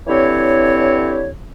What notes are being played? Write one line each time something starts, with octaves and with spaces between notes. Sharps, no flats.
D3 E3 C4 E4 G4 C#5